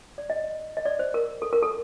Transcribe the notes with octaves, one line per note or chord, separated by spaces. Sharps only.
D5
D#5
D#5
D5
C5
A#4
A4
A#4
A4